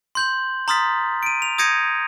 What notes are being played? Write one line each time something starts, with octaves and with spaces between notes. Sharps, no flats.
C6 G6 F#7
A#5 C6 D#6 F6 A6 B6
D7 D#7
F7
D#6 G6 G#6 A#6 C#7 D#7